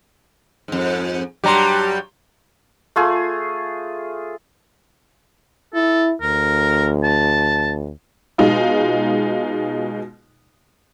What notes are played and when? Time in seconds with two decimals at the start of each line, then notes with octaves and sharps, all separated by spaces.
0.68 F2 G#2
1.44 G2 F#3 G3 G4 A#5 C6
2.96 A3 F4 G#4
5.74 E4 A4
6.22 D2 A#4
7.04 A5
8.38 B2 G#3 D#4 F4